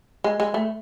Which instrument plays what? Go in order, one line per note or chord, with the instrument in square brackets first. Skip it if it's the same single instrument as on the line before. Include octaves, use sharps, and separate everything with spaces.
[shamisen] G#3
G#3
A3